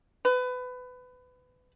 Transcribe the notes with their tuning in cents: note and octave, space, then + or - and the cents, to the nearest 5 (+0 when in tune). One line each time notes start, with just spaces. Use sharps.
B4 +25